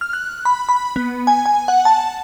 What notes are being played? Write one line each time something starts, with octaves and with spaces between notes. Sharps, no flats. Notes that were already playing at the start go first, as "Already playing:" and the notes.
F6
F#6
B5
B5
B3
G#5
G#5
F#5
A5